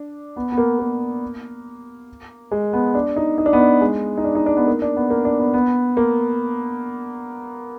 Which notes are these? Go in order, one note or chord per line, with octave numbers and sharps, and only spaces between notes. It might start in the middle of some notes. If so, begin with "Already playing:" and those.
Already playing: D4
B3
B3
A#3
A#3
G#3
B3
D4
D#4
D#4
D4
B3
D4
G#3
D#4
D4
D#4
D4
B3
A#3
D4
B3
A#3
D4
B3
B3
A#3